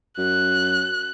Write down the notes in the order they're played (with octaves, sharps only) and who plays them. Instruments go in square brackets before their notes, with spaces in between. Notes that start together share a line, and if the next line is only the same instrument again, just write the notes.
[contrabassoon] F#2 [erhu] F#6